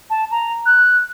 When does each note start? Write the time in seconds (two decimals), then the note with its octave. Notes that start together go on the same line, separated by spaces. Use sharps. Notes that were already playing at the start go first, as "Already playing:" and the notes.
0.10 A5
0.31 A#5
0.66 F#6